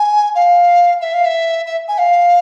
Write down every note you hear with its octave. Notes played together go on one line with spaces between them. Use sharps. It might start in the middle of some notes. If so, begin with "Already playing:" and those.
Already playing: G#5
F5
E5
F5
E5
E5
G#5
F5